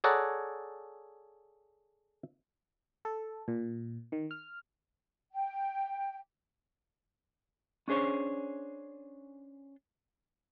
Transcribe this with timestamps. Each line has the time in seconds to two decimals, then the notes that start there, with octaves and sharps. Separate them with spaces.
0.04 G#4 A4 C#5 D5 F#5 A#5
3.05 A4
3.48 A#2
4.12 D#3
4.31 F6
5.34 G5
7.88 C#4 D4 G#4 C5 C#5